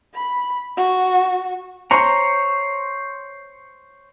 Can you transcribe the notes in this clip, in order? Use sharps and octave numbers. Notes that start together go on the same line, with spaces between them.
B5
F#4
C5 C#5 A#5